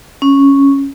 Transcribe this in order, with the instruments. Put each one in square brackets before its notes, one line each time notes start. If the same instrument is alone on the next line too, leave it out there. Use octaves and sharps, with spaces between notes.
[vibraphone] C#4